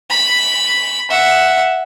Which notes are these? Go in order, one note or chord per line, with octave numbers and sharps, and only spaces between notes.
B5
E5 F#5